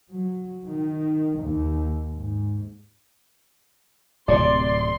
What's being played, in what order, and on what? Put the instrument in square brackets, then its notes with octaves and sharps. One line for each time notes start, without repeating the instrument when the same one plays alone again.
[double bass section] F#3
D#3
D#2
G#2
[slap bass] D1 C3 [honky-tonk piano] D5 [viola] C6